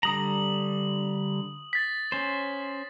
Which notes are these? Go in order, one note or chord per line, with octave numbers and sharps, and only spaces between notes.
D3 G3 A#5 D#6 F#7
A6 B6
C#4 C5